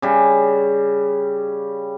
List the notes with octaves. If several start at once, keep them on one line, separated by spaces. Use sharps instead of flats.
C#3 G3